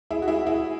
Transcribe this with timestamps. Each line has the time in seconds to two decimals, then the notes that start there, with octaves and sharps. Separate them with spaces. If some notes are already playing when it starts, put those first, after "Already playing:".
0.11 E4 G#4
0.22 F#4
0.28 E4 G#4
0.47 E4 G#4